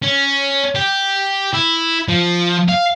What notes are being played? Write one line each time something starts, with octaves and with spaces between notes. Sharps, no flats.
C#4
G4
E4
F3
F5